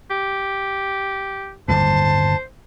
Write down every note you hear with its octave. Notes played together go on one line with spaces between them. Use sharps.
G4
G1 D#2 A2 C5 A5